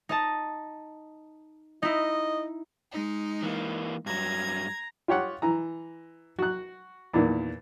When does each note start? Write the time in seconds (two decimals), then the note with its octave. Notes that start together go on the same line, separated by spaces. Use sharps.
0.09 D#4 D#5 A5
1.83 D#4 E4 D#5
2.92 G#3 D#4
3.43 E3 A#3
4.06 G2 F#3 A#5 G#6
5.08 F4 G4 C#5 F#5
5.42 E3 A#5
6.39 F#4 F#6
7.13 E2 A#2 D#3